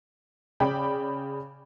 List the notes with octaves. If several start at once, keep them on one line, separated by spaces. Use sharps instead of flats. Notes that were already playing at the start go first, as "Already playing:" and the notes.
C#3 D5 G5 B5